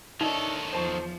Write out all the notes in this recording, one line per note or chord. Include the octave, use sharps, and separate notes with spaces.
D#3 D4 D#4 A4 C#5 D#5 E5
E2 F3 C5 A5 C#6